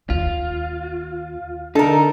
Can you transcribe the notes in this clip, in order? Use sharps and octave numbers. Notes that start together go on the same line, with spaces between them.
D#2 F4
D3 D#4 A4 A#4